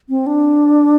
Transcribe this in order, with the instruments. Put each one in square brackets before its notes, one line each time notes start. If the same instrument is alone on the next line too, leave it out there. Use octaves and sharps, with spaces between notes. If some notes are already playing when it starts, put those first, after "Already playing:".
[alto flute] C4
D4